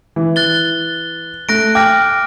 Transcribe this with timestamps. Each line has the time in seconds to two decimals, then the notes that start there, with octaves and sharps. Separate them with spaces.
0.16 E3
0.36 F#6 A6 G7
1.49 A3 F#6 A#6 D7
1.75 G5 D6 F6 A#6